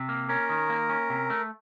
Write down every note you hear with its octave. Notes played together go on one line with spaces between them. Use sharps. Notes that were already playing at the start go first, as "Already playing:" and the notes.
Already playing: C3
A#3
C#4 A#4
D#3
A#3
C#4
C3
A3